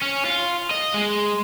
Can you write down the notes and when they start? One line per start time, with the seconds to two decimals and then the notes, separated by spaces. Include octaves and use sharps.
0.02 C#4
0.26 F4
0.71 D#5
0.94 G#3